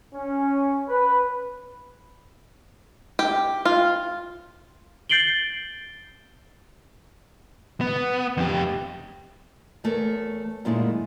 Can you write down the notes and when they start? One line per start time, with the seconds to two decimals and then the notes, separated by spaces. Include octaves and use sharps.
0.14 C#4
0.89 B4
3.19 G4
3.65 F4
5.09 G6 A6 C7 D7 F#7 G7
7.81 B3
8.37 F2 G4
9.84 E2 A3 A#4 C#5
10.65 F#2 A#2 D#3 G#3 A3 E4